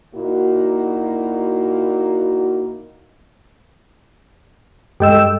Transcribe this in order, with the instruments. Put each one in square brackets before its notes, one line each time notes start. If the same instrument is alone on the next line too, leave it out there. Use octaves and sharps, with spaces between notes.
[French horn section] A#2 A#3 D#4 E4 F#4
[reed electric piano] G2 G#3 [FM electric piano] G4 G5 E6 [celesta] A4 D#5